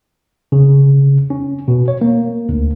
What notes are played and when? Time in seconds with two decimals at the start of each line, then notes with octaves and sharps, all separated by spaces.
0.52 C#3
1.30 C#4
1.68 B2
1.88 C#5
2.01 A#3
2.49 D2